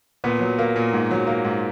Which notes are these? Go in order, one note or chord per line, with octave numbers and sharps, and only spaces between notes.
A#2 B3
F#3
A#3
A#2
G#2
F#3
A#3
G#2